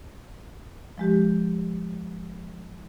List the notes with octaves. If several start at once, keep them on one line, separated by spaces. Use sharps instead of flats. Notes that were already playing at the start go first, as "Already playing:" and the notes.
F3 G#3 G4